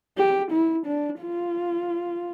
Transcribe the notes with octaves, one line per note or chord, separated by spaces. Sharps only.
G4
E4
D4
F4